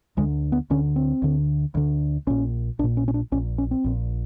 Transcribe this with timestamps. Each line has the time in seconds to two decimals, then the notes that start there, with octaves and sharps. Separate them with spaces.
0.17 D2 D3 G#3
0.52 B3
0.70 D2 D3 C#4
0.96 C4
1.22 D2 D3
1.75 D2 D3
2.27 A#1 A#2 C#4
2.79 A#1 D4
2.84 A#2
2.97 C#4
3.08 C#4
3.14 D4
3.32 A#1 A#2 C#4
3.58 C#4
3.71 C4
3.84 A#1 A#2